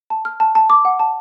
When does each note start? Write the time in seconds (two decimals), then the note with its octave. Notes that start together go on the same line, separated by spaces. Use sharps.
0.10 A5
0.25 F6
0.40 A5
0.55 A5
0.70 D6
0.85 F#5
0.99 A5